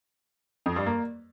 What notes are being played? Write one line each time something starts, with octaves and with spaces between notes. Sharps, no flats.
F2
G2
A#3